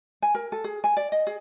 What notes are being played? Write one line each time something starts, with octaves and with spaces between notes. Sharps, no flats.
G#5
A#4
A4
G#4
G#5
D5
D#5
G#4